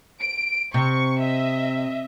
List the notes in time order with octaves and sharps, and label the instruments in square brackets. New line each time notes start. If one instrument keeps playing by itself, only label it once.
[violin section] D7
[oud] C3 [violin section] C#6
[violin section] D#5 E5